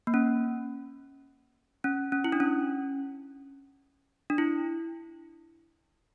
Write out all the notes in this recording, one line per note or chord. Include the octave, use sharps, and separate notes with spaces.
A#3
C#4
C#4
C#4
E4
D4
C#4
D4
E4